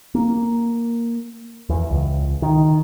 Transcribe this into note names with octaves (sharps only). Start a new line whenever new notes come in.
A#3
E2
C#2
D#3